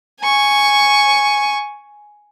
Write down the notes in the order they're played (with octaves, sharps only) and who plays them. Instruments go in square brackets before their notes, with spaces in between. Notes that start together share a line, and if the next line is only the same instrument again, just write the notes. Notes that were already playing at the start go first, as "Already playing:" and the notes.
[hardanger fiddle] G#5 C#6